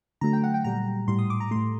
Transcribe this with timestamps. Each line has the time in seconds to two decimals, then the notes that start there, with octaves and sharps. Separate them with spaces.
0.21 D3 F#3 A3 A#5
0.33 G5
0.44 F#5
0.54 G5
0.64 A#2 G3 A#5
1.08 A2 G3 C6
1.19 D#6
1.30 D6
1.40 A#5
1.51 A2 A3 C6